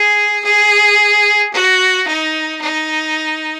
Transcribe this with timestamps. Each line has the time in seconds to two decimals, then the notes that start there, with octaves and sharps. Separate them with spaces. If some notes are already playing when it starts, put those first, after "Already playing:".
Already playing: G#4
0.44 G#4
1.53 F#4
2.08 D#4
2.61 D#4